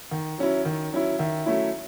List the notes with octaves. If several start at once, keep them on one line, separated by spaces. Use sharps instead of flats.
D#3
F#3 C#4 E4
D#3
F#3 C#4 E4
D#3 E5
F#3 A3 C#4 E4